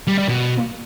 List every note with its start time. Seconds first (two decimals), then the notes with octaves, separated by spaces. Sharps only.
0.07 G3
0.18 G3
0.28 B2